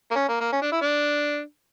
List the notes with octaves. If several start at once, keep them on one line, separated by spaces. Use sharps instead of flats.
A#3
C#4
A#3
A#3
C#4
D4
E4
D4